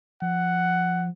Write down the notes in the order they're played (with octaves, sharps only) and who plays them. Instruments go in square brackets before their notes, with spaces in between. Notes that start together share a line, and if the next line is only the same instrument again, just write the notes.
[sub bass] F3 [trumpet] F#5